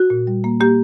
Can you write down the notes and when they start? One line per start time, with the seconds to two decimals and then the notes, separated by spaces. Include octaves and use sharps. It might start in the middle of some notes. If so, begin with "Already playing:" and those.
Already playing: F#4
0.10 A#2
0.27 G3
0.44 A#3
0.61 A#3 G4